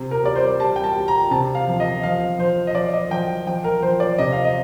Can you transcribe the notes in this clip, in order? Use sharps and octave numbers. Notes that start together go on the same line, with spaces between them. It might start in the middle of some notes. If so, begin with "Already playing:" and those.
Already playing: C3
A#4
G3 D5
C5
G3 A5
G5
A5
G3
A#5
C3 A5
F5
F3
D#5
F3 F5
F3 C5
D#5
F3 D5
D#5
F3 G5
F3 G5
A#4
F3 C5
D5
C3 D#5
F5
D#5